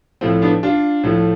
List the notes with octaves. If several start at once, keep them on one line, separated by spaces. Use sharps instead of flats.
A2 F3 A3 C4
B3 D4
D4 F4
A2 F3 A3